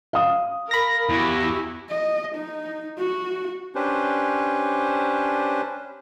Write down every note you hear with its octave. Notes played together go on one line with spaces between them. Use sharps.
F5 D#6
A#4 B5 A#6
E2 E4 F#4 G4
D#5
D#4
F#4
C#4 D4 G4 B4 C5